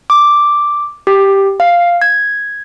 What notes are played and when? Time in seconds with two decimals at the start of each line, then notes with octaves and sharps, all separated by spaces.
0.10 D6
1.07 G4
1.60 F5
2.02 G#6